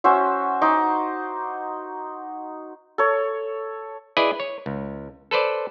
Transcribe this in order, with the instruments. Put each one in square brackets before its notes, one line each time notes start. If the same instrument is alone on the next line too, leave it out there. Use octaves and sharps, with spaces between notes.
[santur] C#4 F#4 C5 E5
D#4 C5 D6
A4 C#5
[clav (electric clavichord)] E4 G#4 B4 D5 D#5
C#5
C#2
A4 B4 C5 D5